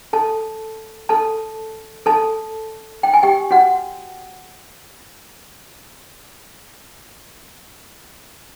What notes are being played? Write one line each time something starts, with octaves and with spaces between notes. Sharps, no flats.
A4 A5
A4 A5
A4 A5
G5
G#5
G4 G5
F#4 F#5